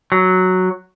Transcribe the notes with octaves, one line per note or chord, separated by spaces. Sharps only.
F#3